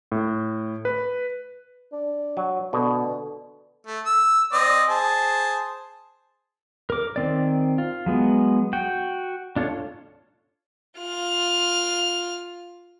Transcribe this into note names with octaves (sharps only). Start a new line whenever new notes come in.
A2
B4
D4
F#3
B2 D3
A3
E6
C4 D5 D#5
G#4 C5 A5
A#4 D6
D#3 C4 D5
F4
F#3 G#3 B3
F#4 G5
D4 F4 A4 C#5
F4 F6